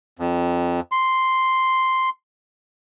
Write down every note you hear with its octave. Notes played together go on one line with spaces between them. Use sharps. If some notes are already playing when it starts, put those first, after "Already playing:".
F2
C6